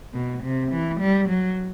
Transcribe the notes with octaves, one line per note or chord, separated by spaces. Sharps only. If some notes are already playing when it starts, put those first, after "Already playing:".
B2
C3
E3
G3
F#3